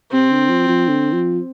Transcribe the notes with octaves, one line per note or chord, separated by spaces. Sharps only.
C3 C4
D3
F3
F3
D3
F3